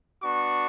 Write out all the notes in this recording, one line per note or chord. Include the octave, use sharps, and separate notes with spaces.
B3 D4 F#4 C#6